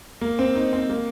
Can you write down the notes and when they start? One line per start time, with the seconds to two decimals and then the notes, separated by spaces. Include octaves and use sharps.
0.21 A#3
0.39 C4
0.55 D#4
0.73 C4
0.90 A#3